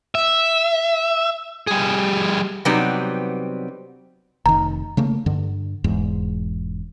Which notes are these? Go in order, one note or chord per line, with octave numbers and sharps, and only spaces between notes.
E5
G3 G#4
C3 F#3 G3 B3 C4 D#4
F1 D#3 A#5
C#3 A3 A#3
G2 D3
E1 E2 G#2